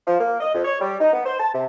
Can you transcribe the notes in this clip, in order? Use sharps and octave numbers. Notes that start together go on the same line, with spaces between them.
F3
A#3
D#5
F2
C#5
G3
D#4
B3
C5
A5
C3